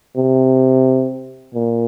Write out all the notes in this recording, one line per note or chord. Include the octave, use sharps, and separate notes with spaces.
C3
A#2